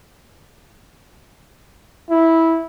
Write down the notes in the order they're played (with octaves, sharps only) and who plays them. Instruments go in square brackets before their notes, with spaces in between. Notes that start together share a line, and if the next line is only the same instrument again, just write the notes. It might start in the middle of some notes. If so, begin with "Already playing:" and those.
[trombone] E4